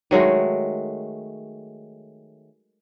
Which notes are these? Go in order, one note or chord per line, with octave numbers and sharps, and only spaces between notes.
D#3 F#3 G#3 A3